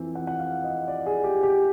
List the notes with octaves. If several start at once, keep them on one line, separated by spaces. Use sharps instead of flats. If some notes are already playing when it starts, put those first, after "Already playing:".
Already playing: F2 E3 C4
F#5
F#5
F5
D#5
D5
G#4
G4
G4